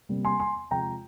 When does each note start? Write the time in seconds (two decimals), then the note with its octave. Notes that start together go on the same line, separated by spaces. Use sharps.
0.09 C3 G3 A#3
0.25 G#5 C6
0.40 G#5 C6
0.71 C3 F3 G#3 G5 A#5